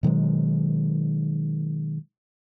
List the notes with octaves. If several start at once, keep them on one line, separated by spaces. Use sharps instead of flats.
B2 D#3 F#3 G#3